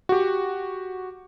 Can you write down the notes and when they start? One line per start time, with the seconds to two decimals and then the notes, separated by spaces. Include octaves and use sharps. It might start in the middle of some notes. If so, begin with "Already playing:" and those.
0.09 F#4 G4